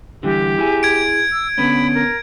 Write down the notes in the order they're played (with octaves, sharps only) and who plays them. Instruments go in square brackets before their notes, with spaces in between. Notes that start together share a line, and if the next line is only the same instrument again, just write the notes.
[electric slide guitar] D3 E3 G3 [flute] G4
[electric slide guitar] E4 G#4 G#5
[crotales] G#6 D7
[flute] E6
[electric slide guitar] D3 B3 C#4 [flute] B5
[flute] A#4